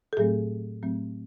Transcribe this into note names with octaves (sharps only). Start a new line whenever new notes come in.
A4
A2 F#3 A3 C4 G#4
A2 F#3 A3 C4